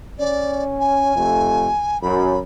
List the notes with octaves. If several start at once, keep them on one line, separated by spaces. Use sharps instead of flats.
C#4 D5
G#5
F2 C3 A3
F#2 B5